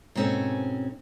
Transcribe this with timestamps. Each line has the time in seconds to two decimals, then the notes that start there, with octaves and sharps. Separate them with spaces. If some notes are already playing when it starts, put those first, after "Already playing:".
0.15 G#2 B2 C4 C#4 A4 G#5